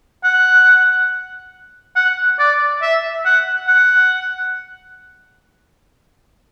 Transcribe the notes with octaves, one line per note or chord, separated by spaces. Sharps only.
F#5
F#5
D5
E5
F#5
F#5